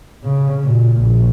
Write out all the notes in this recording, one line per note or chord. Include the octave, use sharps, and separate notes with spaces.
C#3
A#2
A#1